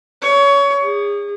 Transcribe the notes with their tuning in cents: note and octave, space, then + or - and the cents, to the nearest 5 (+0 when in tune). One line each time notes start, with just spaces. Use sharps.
C#5 +25
G#4 -35